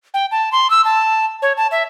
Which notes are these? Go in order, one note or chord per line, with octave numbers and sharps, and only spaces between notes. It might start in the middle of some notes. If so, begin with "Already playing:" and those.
G5
A5
C6
E6
A5
C#5
A5
E5